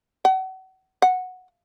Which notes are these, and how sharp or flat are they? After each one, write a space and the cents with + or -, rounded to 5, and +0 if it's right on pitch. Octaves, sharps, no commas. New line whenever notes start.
F#5 +35
F#5 -10